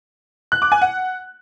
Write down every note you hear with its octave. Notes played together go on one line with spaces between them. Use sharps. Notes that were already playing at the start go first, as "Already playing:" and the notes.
F#6
D6
G#5
F#5